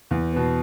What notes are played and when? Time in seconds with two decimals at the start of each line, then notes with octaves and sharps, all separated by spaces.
0.11 E2
0.33 B2 B3